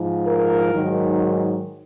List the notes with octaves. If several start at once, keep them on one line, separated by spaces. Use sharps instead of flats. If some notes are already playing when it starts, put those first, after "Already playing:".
Already playing: G#2 F3
A#4
G#2 D#3 F#3